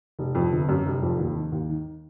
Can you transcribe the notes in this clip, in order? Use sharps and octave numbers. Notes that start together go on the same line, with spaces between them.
F1
F2
G1
F#2
F1
F2
D#2
D#3
D#2
D#3